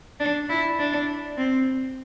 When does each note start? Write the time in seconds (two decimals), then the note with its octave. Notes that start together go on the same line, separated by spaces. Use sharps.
0.20 D4
0.49 E4
0.79 D4
1.37 C4